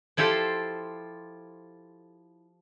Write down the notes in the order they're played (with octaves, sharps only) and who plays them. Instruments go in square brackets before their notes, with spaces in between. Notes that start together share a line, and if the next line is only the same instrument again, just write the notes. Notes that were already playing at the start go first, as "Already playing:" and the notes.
[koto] F3 E4 F4 G4 A4 C5